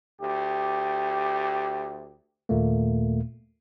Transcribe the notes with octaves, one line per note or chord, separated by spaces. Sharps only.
D2 G4
D#2 A#2 A3 A#3